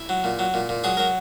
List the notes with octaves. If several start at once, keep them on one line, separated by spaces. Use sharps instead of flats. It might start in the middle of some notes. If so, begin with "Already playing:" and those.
Already playing: E4
F#3
A#2
F#3
A#2
A#2
F#3 G#4
F#3 A#4